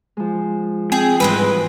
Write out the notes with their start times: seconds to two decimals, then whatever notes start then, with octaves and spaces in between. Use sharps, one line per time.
0.17 F3 G#3
0.92 C4 G#4 G5
1.20 G#2 E3 G3 G#3 C4 B4